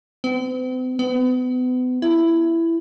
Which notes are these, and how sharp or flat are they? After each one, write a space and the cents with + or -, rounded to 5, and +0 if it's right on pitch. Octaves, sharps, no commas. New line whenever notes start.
C4 -45
B3 +35
E4 +10